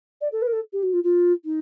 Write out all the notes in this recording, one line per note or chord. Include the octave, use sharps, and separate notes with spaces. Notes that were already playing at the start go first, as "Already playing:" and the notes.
D5
A4
B4
A#4
A4
G4
F#4
F4
F4
D#4